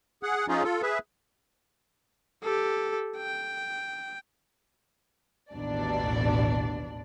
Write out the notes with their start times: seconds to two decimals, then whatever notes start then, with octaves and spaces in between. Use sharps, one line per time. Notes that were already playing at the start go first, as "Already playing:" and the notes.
0.23 G#4 F#5
0.48 F3 C#4 D#4 F4 G#4
0.64 F4 A4
0.82 G#4 B4 E5
2.43 G4 A4
3.17 G5
5.53 A1 D#2 B2 D4 D5